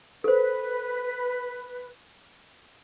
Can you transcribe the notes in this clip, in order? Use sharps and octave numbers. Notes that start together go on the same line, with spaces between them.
A4 B4 C5